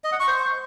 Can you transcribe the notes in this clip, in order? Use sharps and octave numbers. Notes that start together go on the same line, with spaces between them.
D#5
F#5
C#6
C5